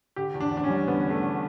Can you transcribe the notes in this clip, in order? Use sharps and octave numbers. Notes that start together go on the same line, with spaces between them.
D3 G4
E2
D4
E2
D4
C#4
G3
D3 B3
E2
A3
E2